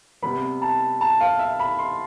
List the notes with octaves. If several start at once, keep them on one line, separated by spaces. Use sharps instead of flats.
C3 G3 B3 B5
A5
A5
F5
E5
B5
C6